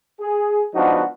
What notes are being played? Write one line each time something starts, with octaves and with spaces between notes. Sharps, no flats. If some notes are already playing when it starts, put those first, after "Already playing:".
G#4
C#2 F3 B3 D4 D#4 F#4